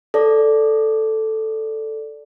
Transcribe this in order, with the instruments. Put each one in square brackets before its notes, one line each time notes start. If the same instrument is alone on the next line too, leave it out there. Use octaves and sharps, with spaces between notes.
[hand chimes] A4 D5